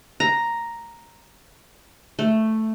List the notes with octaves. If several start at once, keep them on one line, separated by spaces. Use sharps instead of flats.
A#5
A3